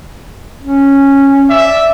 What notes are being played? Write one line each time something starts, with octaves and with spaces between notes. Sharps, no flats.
C#4
D5 E5